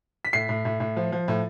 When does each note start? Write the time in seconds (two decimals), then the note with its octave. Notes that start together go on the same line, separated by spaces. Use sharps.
0.25 B6
0.33 A2 C7
0.49 A2
0.65 A2
0.80 A2
0.97 F3
1.12 F3
1.28 A2